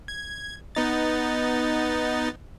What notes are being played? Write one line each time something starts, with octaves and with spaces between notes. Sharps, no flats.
G#6
B3 D#4 A6